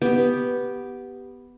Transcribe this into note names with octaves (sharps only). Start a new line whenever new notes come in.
B3 G4